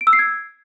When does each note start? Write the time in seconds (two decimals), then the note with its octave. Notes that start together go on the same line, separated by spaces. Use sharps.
0.01 D7
0.07 E6
0.13 C7
0.19 G#6